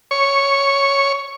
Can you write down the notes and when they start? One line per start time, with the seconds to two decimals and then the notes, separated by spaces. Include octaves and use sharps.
0.11 C#5 C#6